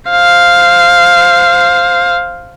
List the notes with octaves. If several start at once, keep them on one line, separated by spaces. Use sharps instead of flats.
C5 F5